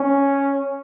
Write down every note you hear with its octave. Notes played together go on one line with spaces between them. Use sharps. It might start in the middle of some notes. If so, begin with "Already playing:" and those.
Already playing: C#4